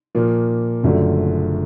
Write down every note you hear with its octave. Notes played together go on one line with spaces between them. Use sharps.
A#2 F3 A#3
F#1 F#2 D3 F3 A3